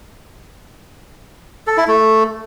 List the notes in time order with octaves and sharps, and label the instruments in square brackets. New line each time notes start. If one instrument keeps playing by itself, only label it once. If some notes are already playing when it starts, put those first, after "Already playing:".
[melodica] A4
E4
A3